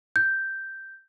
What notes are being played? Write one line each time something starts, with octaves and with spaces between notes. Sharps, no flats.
G6